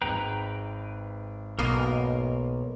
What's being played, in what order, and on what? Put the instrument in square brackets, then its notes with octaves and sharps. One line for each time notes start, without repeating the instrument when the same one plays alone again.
[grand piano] G#1 G#3 [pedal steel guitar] B4 G5 A#5
[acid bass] B1 [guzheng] B2 A#3 D#5 [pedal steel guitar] A#4 F6